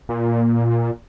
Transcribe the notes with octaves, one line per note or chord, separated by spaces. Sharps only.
A#2